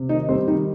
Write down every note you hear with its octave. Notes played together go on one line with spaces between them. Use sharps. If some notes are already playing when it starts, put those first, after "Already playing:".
Already playing: C3
D#3 D#4 D#5
G3 C4 C5
D#3 D#4 D#5